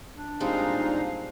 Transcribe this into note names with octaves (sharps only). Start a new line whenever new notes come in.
D4
A#2 G3 G#3 C4 D#4 F5